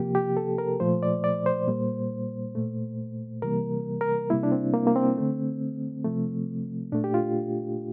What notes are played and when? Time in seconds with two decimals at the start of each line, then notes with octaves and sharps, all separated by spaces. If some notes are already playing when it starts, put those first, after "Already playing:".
Already playing: C3 F3 A#3 G4
0.15 G4
0.37 A4
0.58 A#4
0.80 A#2 F3 A3 C5
1.03 D5
1.24 D5
1.46 C5
1.68 A#2 G3 A#3
2.55 A#2 A3
3.42 C3 E3 G3 A#3 A#4
4.01 A#4
4.30 C3 G3 A#3 E4
4.43 D4
4.52 C4
4.74 A#3
4.87 A#3
4.96 C4
5.17 D3 A3
6.04 C3 F3 A3
6.92 A#2 A3 D4
7.04 G4
7.14 F4